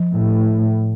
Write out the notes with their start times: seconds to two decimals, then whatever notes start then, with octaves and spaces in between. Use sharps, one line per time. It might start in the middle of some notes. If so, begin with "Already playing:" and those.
Already playing: F3
0.13 A2